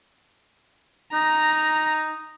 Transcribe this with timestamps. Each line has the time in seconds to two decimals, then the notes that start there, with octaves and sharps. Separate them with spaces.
1.13 D#4 A#5